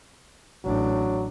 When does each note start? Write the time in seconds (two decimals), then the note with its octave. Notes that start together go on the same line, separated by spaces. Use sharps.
0.64 A1 F#3 D4